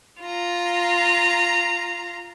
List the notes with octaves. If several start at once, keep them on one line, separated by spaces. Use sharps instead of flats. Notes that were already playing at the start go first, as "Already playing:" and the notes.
F4 A#5